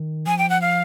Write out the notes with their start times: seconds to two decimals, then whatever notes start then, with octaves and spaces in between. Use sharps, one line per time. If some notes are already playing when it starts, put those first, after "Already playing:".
Already playing: D#3
0.27 F3 G#5
0.38 G5
0.50 F#5
0.62 F5